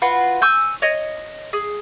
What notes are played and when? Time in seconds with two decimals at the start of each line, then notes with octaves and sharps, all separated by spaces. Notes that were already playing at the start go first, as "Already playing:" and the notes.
0.02 F4 F#4 B4
0.42 G#5 C#6 E6 G6
0.82 C#5 D#5
1.53 G#4